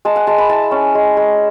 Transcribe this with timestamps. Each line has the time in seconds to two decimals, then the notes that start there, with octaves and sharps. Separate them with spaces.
0.05 G#3 A5
0.16 F#5
0.27 G#3 A5
0.38 B5
0.49 E4 A5
0.71 C#4
0.95 G#3
1.17 G#3